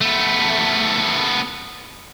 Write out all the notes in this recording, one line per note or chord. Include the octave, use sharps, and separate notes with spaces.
A3 B3